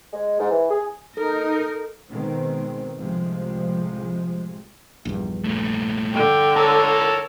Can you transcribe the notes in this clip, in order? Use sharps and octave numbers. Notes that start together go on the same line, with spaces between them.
G#3
G#2
E3
G#4
D#4 A4 A#4
B2 D#3 G#3 C4
C2 A2 C3 F3 G#3
A#1 E2 G2
A#2 A3
D3 G5
A#4 C#5 A5 E6